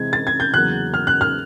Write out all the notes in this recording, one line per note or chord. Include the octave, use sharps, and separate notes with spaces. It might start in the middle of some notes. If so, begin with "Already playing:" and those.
Already playing: C3 E3 G#3 C4 E4 G#6
A6
G#6
G6
E2 C#3 F#3 A#3 F#6
F6
F#6
F6